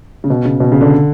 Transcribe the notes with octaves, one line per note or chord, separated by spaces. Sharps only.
C#3
B2
C#3
B2
C#3
D3